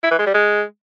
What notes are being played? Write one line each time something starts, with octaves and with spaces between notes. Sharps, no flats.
E4
E3
G#3
G3
G#3